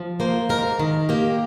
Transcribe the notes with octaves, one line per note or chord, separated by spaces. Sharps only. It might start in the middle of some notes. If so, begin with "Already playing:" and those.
Already playing: F3
A#3 C5
G#2 A#4
D#3
A#3 G4